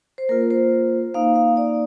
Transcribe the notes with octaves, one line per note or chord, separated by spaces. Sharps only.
C5
A#3 F4 A#4
C5
A#3 D#4 F5
F5
D5